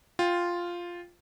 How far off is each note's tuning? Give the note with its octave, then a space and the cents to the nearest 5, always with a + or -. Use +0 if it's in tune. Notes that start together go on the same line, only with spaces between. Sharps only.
F4 +0 G5 +0